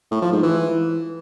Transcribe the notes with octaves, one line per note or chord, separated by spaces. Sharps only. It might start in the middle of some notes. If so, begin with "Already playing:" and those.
A2
F3
G#2
E3